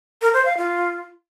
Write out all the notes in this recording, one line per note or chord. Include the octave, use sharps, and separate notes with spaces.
A#4
C5
F5
F4